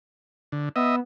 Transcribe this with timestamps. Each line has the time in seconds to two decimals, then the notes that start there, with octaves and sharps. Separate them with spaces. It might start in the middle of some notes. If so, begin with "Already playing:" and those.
0.52 D3
0.76 B3 D#5 E5